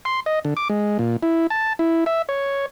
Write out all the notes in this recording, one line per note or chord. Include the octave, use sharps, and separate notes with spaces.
C6
D#5
D3
D6
G#3
A#2
E4
A5
E4
E5
C#5